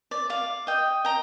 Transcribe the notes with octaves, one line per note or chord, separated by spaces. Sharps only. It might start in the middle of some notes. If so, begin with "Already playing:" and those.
D5
D5 F5
D#5 G5
G5 A#5